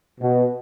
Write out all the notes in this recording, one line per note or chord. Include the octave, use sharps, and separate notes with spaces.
B2